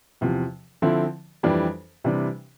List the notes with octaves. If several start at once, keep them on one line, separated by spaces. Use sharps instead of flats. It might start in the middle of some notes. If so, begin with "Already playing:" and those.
E2 C3 F3
D3 F3 C4 E4
F2 E3 G3 D4
C3 E3 G3 D4